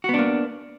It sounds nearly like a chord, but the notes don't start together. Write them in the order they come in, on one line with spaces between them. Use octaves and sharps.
F#4 B3 D4 A#3